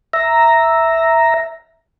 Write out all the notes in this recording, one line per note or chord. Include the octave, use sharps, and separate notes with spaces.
E5 A#5